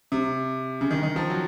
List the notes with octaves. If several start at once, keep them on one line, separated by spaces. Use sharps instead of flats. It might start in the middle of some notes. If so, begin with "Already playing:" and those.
C3
C#3
D#3
D#3
F3
F#3